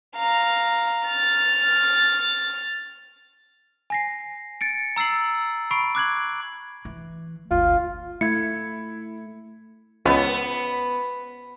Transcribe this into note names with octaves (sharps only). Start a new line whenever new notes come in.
F5 A#5
F6 A6
G#5 A#6 C7
A6 C#7 D7
A#5 E6 A6 C7 F#7
B5 C#6 C7 D7
D6 F#6 G#6 F#7
E3
G1 D2 F4
A3 E4 G#6 C#7
C#2 B3